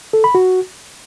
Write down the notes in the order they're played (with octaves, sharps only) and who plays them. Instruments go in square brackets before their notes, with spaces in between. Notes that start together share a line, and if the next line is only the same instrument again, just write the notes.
[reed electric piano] A4
B5
F#4